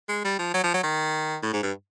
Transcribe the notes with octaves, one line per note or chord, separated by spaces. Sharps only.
G#3
G3
F3
F#3
F3
F#3
D#3
A2
G#2
G2